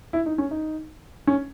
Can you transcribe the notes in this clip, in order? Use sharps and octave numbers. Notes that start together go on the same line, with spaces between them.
E4
D#4
C#4
D#4
C#4